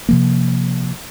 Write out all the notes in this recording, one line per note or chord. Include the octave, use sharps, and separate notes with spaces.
C3 F3 A#3